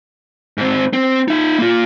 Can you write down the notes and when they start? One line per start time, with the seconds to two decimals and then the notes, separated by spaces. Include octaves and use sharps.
0.58 G#2 C4
0.93 C4
1.28 D#4 E5
1.59 A#3 F4